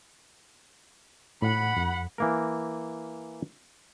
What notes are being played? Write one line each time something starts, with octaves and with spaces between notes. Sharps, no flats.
A2 F#5 B5
F2
E3 A#3 A#4